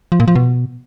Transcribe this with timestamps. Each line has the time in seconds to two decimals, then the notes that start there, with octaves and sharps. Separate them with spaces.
0.12 F3
0.20 A#2
0.28 F3
0.35 B2